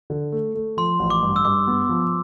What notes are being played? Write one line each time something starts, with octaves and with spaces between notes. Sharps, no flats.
D3
A3
A3
F3 C6
A1
D6
G2
E6
G2 D6
B3
F3